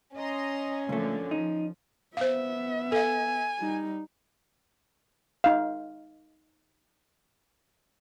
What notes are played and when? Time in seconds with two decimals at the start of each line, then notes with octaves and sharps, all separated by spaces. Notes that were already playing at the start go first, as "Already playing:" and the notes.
0.15 C#4 D#5 A#5 C6
0.89 C#2 A#2 D3 F3 A3
1.31 F3 D#4
2.17 B3 C5 E5 F5
2.92 A4 F5 G#5
3.59 G3 D#4
5.44 D#4 F5